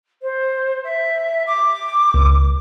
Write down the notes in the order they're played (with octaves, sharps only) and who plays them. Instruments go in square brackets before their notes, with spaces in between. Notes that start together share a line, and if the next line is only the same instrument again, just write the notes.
[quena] C5
E5
D6
[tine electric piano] C#2